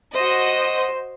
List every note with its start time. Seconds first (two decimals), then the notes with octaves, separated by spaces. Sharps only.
0.15 F#4 C5 D#5